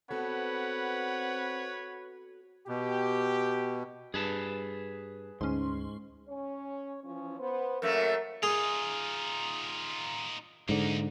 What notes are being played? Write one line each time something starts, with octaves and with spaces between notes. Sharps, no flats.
B3 C4 F#4 A4 B4 C#5 F#5 B5
B2 G4
G2 G#4 B4 A5
D2 G#2 C#4 C6
C#4 C#5
E3 F3 C#4
B3 C5
F#2 A3 A#3 A#4
D#4 F4 G#4
G#2 D3 A#3 D#4